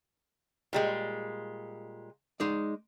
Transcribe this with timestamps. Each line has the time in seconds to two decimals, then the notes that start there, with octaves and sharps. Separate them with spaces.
0.73 A#2 G3 G#3
2.40 G#3 D#4 D5